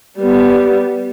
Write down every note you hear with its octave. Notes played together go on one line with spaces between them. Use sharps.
G3 B3